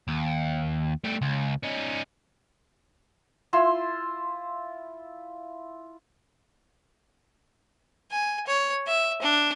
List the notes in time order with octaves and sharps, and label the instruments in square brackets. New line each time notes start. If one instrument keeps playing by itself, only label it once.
[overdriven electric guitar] D#2
G3 A3
C#2
C#4 D#4
[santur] E4 F4 C6 E6
[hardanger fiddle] G#5
C#5
E5
D4